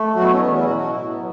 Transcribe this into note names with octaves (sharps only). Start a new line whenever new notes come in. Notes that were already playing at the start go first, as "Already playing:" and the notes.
Already playing: A3
B2 F#3 F#4
E4
C#4
E2 B3
C#4
E4
B2 F#3 F#4
F#4
A2 E4
B3
F#3